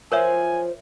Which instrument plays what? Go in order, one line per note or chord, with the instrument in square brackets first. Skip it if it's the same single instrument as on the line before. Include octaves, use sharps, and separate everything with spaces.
[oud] F3 F#3 F4 [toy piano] A#4 C#5 E5 [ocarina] C5 [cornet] G#5